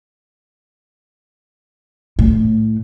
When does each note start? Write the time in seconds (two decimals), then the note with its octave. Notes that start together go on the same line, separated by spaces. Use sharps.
2.19 A2